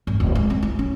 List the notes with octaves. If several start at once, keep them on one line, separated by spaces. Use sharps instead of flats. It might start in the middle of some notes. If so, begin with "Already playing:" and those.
G#1
D1
G#2
C4
E4
C#4